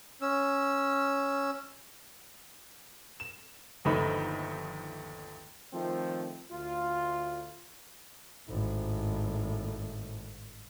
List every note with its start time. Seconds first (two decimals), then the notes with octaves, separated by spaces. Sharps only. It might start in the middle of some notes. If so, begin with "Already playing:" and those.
0.21 C#4 E6
3.20 E7
3.85 G1 D#2 F3 A3 D#4 B5
5.73 D#3 F3 A3 C4
6.51 D2 F4
8.47 G#1 A2